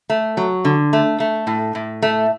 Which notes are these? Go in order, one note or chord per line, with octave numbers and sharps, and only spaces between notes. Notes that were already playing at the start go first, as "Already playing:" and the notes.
A3
F#3
D3
A3
A3
A2
A2
A3